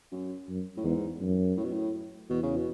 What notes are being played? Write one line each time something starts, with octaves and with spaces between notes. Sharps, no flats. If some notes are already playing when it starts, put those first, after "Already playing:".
F#2
F#2
A2
E2 G#2
F#2
A2
B2
A2
E2 B2
C#3
B2